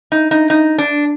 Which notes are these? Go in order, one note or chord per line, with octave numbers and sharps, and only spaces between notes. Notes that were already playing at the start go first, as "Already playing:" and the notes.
D#4
D#4
D#4
D4